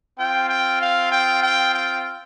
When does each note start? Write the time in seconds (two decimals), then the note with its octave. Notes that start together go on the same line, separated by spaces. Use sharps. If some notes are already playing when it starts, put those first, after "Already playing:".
0.18 C4 F4 G5
0.48 G5
0.80 F5
1.11 G5
1.42 G5
1.73 G5